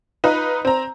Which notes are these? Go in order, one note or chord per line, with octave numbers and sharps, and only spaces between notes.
D#4 F4 B4
C4 A#5